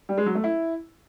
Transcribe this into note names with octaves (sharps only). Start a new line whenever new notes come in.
G3
G#3
F#3
A3
E4